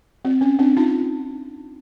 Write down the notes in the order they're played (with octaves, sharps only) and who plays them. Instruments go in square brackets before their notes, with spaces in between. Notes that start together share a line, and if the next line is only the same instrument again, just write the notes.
[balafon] C4
C#4
C4 D4
D#4 F4